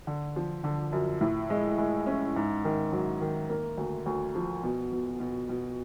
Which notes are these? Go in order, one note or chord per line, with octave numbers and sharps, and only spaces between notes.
D3
F3
D3
F#2
A2
G#3
G#3
C#4
G#2
D#3
F#3
D#3
A#3
D2
D2
F3
B2
B2
B2
B2